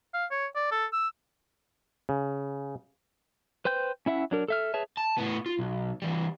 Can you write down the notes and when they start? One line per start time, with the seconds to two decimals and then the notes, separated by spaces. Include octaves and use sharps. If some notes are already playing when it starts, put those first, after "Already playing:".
0.14 F5
0.31 C#5
0.56 D5
0.71 A4
0.93 E6
2.09 C#3
3.65 B4 C5 G5 G6
4.06 C#4 E4 E5 F#5
4.31 F#3 D4 A#4
4.48 A4 E5 F6
4.74 G#4 B4 C#5 E5 A5
4.97 A5
5.18 A2 B3
5.46 F4
5.59 B1
6.02 E3 G3